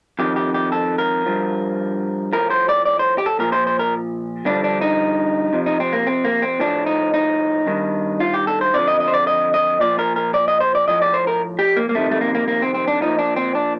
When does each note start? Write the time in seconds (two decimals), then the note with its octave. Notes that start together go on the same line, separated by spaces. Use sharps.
0.19 F2 D#3 G4
0.36 G4
0.54 G4
0.72 A4
0.98 A#4
1.26 G2 F3
2.33 A2 F3 A#4
2.50 C5
2.69 D5
2.85 D5
2.99 C5
3.18 G4
3.26 A4
3.39 A#2 F3 A#4
3.52 C5
3.67 C5
3.79 A#4
4.46 G2 D3 F3 D4
4.64 D4
4.81 D#4
5.53 F2 C3 F3
5.66 D#4
5.80 C4
5.93 A#3
6.07 C4
6.24 A#3
6.42 C4
6.60 A2 F3 D4
6.86 D#4
7.14 D#4
7.67 G2 D#3
8.20 F4
8.34 G4
8.47 A4
8.61 C5
8.74 F2 D3 F3 D5
8.88 D#5
9.00 D#5
9.08 C5
9.14 D5
9.27 D#5
9.54 D#5
9.80 A#2 F3 D5
9.99 A#4
10.16 A#4
10.34 D5
10.48 D#5
10.60 C5
10.75 D5
10.88 A2 F3 D#5
11.02 D5
11.14 C5
11.27 A#4
11.59 G4
11.77 A#3
11.89 A#3
11.95 F2 C3 D#3 A3
12.11 A3
12.21 A#3
12.35 A#3
12.48 A#3
12.62 C4
12.74 C4
12.87 D4
13.02 A#2 F3 D#4
13.19 D4
13.36 C4
13.55 D4